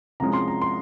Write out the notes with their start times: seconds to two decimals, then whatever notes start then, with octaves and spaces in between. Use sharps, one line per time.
0.20 C2 C3 F3 G#3 C#4 A#5
0.33 C6
0.48 A#5
0.62 C6